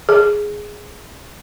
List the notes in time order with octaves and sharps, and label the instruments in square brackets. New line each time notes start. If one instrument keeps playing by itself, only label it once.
[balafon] G#4